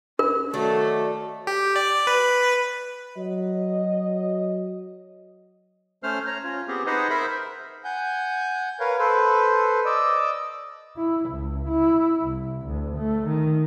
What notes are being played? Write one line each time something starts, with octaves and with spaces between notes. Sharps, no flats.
C#4 A#4
D#3 F#3 A3 F#4 D5
G4
D5
B4
F#3 D#5
A3 C#4 C5 F6
C#5 A#5
C#4 F4
B3 C4 G4 G#4
D#4 G#4 B4 C5 D#5 F#5
A#4 C5 E5 B5
F#5 G#5 G6
A#4 B4 C#5 F5
A4 B4 C5
D5 D#5 D6 E6
E4
C#2
E4
C2
D2
A3
D#3